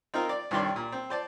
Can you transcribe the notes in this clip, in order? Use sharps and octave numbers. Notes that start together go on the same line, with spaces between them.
C4 D#4 F4 A#4
D5
C2 G2 D#3 C#5 D5 C6
A#2
C4
C5 D5 A5